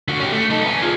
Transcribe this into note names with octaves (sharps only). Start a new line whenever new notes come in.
D3 F#4
C#4 G4
A3
D#4 A4
B3 G#5
F4 G#4